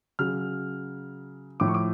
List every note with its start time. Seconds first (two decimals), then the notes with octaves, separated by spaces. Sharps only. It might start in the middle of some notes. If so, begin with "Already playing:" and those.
0.19 C#3 F#3 F6
1.60 A2 F3 D6
1.68 C#6
1.75 D6